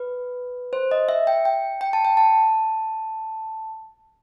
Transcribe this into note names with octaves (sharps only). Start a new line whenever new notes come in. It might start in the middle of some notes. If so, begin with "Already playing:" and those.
Already playing: B4
C5
D#5
E5
G5
G5
G5
A5
G5
A5